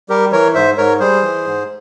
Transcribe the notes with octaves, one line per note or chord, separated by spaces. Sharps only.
G3 G4 A#4
E3 A#4 C#5
G#2 C5 E5
G#2 A#4 C#5
G3 G#4 C5
E3
G#2